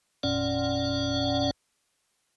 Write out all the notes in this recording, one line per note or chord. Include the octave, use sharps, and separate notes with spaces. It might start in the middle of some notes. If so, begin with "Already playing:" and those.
G1 F2 A#2 C#4 D5 F#5